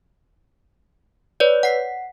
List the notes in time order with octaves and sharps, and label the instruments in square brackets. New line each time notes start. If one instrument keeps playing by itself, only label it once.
[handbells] B4 C#5 D5
F#5 C7